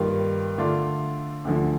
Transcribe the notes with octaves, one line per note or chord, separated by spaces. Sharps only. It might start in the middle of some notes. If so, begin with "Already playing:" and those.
Already playing: G2 D#3 G3 A#3 F4
D3 A3 D4 F4
D2 D3 F3